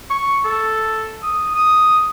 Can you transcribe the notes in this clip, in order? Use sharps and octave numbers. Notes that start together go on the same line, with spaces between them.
C#6
A4
D#6
D#6